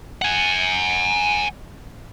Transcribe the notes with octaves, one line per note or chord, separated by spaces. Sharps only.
F#5 G#5